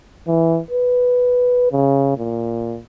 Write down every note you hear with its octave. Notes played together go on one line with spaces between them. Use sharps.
E3
B4
C#3
A#2